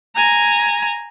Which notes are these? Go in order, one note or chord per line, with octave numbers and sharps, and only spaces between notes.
G#5 A#5